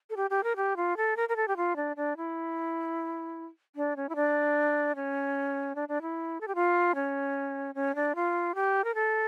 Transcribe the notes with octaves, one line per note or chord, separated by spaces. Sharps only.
A4
G4
G4
A#4
G4
F4
A4
A#4
A#4
A4
G4
F4
D4
D4
E4
D4
C#4
E4
D4
C#4
D4
D4
E4
A4
G4
F4
C#4
C#4
D4
F4
G4
A#4
A4